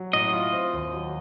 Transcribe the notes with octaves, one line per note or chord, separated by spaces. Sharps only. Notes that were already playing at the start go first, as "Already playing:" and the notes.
Already playing: F#3
A2 D#5
F4
C4
D#2
F#3